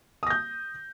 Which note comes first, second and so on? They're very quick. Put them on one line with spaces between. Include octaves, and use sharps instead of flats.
D#6 A#6 G6